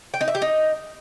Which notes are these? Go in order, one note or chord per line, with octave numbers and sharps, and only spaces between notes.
G5
D#4
E5
G4
D#4